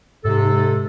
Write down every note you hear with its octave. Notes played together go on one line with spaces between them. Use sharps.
G#2 C3 A4